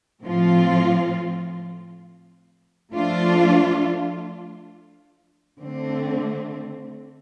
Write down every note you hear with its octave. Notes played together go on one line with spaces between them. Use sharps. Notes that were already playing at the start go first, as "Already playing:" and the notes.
A2 F3 C4 F4
F3 A3 D4 F4
D3 A3 C4